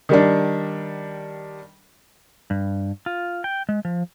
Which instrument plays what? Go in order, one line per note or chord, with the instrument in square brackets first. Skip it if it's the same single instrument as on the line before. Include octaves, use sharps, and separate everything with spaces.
[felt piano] D#3 G3 D4
[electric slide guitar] G2
F4
G5
G#3
F3